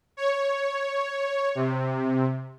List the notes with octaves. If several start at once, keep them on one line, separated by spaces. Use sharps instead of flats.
C#5
C3